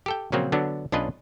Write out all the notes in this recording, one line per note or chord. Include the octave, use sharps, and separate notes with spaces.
G4 A4 G5
A#2 C#3 F3 F#3 A#3 C4
D3 F#3 B3 D4
B1 C#4 D4 F4 B4 D#5